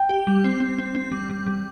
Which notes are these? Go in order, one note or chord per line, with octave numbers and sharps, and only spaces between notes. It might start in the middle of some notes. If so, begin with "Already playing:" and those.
Already playing: G5
G4
G3
C4
C4
C4
C4
G3
G3
G3